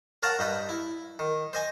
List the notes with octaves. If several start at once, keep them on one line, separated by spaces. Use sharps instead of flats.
A#4 C#5 F5 F#5 A5 A#5
G2 D#4 B4
E4
D#3
C5 D#5 G#5